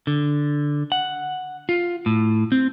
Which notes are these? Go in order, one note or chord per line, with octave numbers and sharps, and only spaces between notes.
D3
F#5
F4
A2
C4